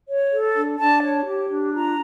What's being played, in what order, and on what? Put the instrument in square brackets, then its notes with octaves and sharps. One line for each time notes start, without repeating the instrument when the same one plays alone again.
[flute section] C#5
A4
D4
D4 A5
C#5
G4
D4
F4 A#5